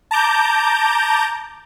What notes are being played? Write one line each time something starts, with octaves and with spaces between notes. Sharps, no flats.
A5 A#5 D6 G6